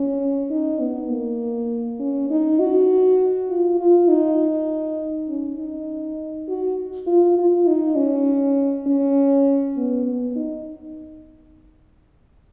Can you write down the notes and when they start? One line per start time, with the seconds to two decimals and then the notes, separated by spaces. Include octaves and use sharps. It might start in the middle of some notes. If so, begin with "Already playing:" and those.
Already playing: C#4
0.50 D#4
0.80 B3
1.10 A#3
2.00 C#4
2.30 D#4
2.59 F#4
3.50 F4
3.80 F4
4.08 D#4
5.28 C#4
5.59 D#4
6.48 F#4
7.07 F4
7.38 F4
7.67 D#4
7.97 C#4
8.87 C#4
9.76 B3
10.06 B3
10.36 D#4